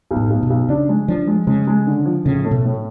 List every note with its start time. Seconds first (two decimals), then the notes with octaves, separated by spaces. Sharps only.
0.11 B1
0.16 A2
0.30 B1
0.43 B2
0.50 B1
0.69 C#3 D4
0.89 G#3
1.08 F3 D4
1.27 G#3
1.47 C#3 G#3
1.67 G#3
1.87 D3
2.06 F3
2.25 A2 C#3
2.45 A3
2.51 B2
2.65 A2